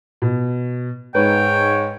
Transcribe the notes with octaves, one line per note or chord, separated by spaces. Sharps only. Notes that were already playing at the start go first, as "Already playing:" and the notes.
B2
G#2 B4 C#5 G5